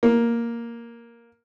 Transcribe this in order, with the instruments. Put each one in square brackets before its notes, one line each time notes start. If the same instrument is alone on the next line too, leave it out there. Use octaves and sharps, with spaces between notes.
[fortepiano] A#3